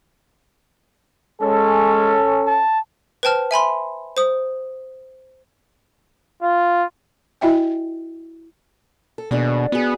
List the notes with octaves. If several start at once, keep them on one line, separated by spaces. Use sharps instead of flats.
G#3 C#4 A4
A5
B4 C5 G5 A5 F6
E5 G#5 B5 C6
C5 D#6
F4
E4 F#4 D#5 E5 G5 G#5
A4
D#2 B2 D4 G#4
B3 F#4 G#4